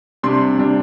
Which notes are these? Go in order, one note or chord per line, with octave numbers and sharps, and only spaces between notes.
C3 G3 D4 C6
C3 G3 D4